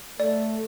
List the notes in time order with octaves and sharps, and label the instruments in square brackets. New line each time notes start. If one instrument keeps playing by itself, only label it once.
[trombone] A3 [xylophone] D5